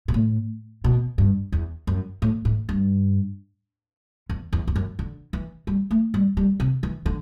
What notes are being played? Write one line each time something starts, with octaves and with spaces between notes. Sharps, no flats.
B2
A2
B2
G2
E2
F#2
A2
A2
G2
E2
E2
E2
F#2
D3
E3
G3
A3
G3
G3
C3
E3
D3